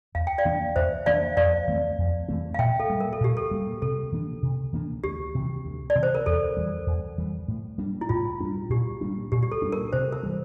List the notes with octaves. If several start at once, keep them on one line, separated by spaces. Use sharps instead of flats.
E2 F5
G5
D5 F5
E3 A#3 D4
E2 C5 E5
E3 A#3 D4 D5 F5
F2 D5 F5
E3 A3 C4
F2
E3 A3 C4
F5
A#2 E5 G5
A4
G3 A#3
A#4
A4
A#2 G4
A4
G3 A#3
C3 A4
E3 A#3 D4
C3
E3 A#3 D4
D2 G4
C3 E3
D2
D5
C3 E3
C5
A#4
E2 A4
E3 G3
E2
E3 G3
A2
G3 A#3 D4
E4
A2 F4
G3 A#3 D4
A#2 G4
G3 A#3 D4
A#2 G4
G4
A4
G3 A#3 D4
A#4
C3 C5
A#4
E3 G3